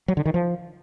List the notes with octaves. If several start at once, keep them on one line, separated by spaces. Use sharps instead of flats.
F#3
D3
D#3
F3